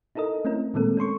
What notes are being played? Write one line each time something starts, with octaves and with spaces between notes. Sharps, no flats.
D#4 E4 A4 A#4 D#5
A3 C4 C#4 E4 A#4
A#2 D#3 G#3 A#3 C4 A4
C#4 A4 C6 C#6